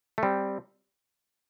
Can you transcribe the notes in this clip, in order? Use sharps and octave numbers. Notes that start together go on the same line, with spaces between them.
A3
G3 C4